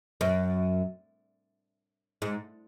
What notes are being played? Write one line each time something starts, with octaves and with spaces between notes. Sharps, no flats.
F#2
G#2